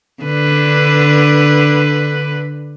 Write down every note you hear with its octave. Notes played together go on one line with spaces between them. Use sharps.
D3 D4 B4